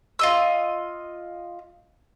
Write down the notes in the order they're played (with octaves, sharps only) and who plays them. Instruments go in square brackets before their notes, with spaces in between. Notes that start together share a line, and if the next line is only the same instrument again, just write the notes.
[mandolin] F4 D#5 E6